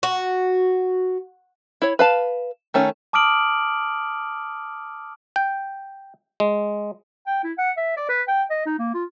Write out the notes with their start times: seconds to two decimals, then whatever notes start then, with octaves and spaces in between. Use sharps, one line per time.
0.03 F#4
1.82 E4 C#5
1.99 B4 F5 A5
2.74 D#3 A3 C#4
3.13 A5 D6 D#6 F6 D7 F#7
5.36 G5
6.40 G#3
7.27 G5
7.44 E4
7.58 F#5
7.77 E5
7.97 D5
8.09 B4
8.28 G5
8.50 D#5
8.66 D#4
8.79 A#3
8.94 F4